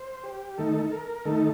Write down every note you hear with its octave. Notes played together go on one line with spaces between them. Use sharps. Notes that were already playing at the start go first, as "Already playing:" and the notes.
Already playing: C5
G4
D#3 A3 D#4 A4
A#4
D#3 A3 D#4 A4